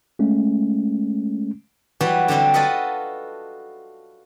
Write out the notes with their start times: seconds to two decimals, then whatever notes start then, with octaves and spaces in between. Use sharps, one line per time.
0.19 G#3 A3 C#4
2.01 E3 F#3 G3 F#4 B4
2.28 D3 F#3 G3 C4 F#4
2.54 F4 F#4 A4 B4 D#5 F#5